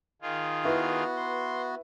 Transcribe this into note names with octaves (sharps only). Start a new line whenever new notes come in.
D#3 F4 G#4
B3 E4 F#4 B4 E5
C6